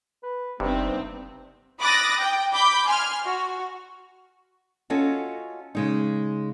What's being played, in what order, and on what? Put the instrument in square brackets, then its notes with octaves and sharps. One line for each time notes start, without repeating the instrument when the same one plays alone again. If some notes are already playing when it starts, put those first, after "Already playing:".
[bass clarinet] B4
[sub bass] F#1 [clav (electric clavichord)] G2 C3 [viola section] B3 C4 [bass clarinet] D#4
[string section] B5 D6 D#6 F#6 A6 A#6
G5
B5 D6 G6
G#5 C6 F6
F#4
[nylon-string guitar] C#4 F4 F#4 A4 C#5 D#5
C#3 G#3 D#4